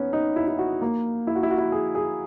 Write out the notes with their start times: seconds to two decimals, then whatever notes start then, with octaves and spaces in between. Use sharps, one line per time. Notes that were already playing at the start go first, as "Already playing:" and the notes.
Already playing: B3 C#4 D#4
0.13 D#4
0.36 E4
0.48 E4
0.59 F#4
0.82 A#3
1.27 E4
1.36 F#4
1.43 E4
1.51 F#4
1.58 E4
1.72 G#4
1.95 G#4